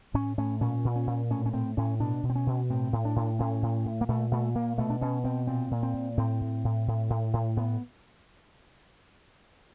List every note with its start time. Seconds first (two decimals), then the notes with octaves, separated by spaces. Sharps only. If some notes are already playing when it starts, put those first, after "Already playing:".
0.14 A2 C#4
0.38 A2 C#4
0.61 A#2 C#4
0.85 A#2
0.96 C#4
1.07 A#2
1.30 A2 C#4
1.46 C#4
1.53 A2 C4
1.77 A2 C#4
2.00 B2 D4
2.23 B2
2.30 C4
2.35 C#4
2.47 B2
2.70 A2 C4
2.93 A2
3.05 D4
3.16 A2
3.39 A2 C#4
3.62 A2
3.86 A2
4.01 A#3
4.09 A#2 A3
4.31 A#2 A3
4.55 A#2 A#3
4.78 B2 A3
4.90 D4
5.01 B2 C#4
5.24 B2 C4
5.47 A#2 C4
5.71 A#2
5.83 C4
5.94 A#2
6.17 A2 C4
6.41 A2
6.64 A2
6.88 A2
7.10 A2
7.33 A2
7.57 A2 B3